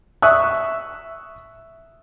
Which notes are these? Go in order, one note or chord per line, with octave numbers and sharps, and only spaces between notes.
E5 C#6 D#6 E6 F#6